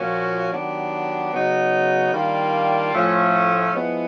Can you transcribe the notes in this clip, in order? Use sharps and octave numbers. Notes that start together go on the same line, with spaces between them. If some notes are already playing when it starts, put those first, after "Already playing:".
Already playing: A#2 F3 A#3 C#4 F#4
D#3 F#3 B3 D4 G4
C#3 F#3 B3 D#4 F#4
D#3 G3 A#3 D4 F4
A2 F3 A3 C#4 F4
F3 G#3 B3 E4